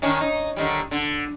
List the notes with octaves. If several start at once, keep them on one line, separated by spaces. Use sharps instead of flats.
D#3 C#4 D4
D#4
D3 D#3 G3
D3